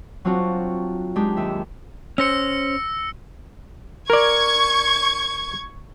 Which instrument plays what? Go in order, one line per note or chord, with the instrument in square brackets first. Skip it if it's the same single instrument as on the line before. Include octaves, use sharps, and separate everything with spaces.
[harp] F#3 C4 D4 F4 F#4
G#3 D4 D#4 G4
D#2 E5
[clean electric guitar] C#4 C5 [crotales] E6 A#6 C#7
[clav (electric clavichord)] A#4 D5 [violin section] C#6 G#6